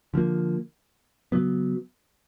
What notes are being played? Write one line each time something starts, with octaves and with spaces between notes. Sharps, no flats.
D3 F3 A#3
C#3 F#3 B3